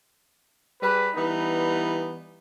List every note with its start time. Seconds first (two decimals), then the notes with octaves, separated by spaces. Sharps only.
0.81 G3 G#4 B4
1.15 E3 G3 B3 D#4